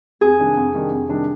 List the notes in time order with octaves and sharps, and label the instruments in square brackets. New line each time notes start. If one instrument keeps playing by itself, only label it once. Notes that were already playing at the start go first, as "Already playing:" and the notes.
[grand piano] F2 [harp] G#4
[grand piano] C3 D#3 G3 D4
F2
C3 D#3 G3 D4
F2
C3 D#3 G3 D4